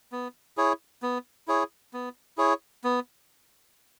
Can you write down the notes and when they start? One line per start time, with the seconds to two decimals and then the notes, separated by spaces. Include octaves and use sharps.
0.12 B3
0.57 E4 G#4 C#5
1.02 B3
1.48 E4 G#4 C#5
1.93 B3
2.37 E4 G#4 C#5
2.84 B3